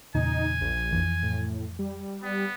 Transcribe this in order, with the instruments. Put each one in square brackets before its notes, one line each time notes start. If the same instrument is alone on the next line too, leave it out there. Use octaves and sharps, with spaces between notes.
[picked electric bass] E2 A#2 C#3 [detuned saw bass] D#4 [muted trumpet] G#5
[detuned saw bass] A#1
[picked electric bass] F2 E3
[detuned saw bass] A2
G3
[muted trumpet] B3